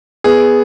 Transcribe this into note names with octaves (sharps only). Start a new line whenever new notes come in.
B3 G#4